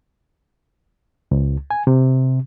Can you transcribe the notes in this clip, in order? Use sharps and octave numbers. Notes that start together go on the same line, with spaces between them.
C#2
G#5
C3